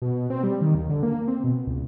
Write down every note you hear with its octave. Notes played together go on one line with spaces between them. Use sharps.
B2
C4
G3
D#3
D#2
D3
A#3
C4
B2
C#2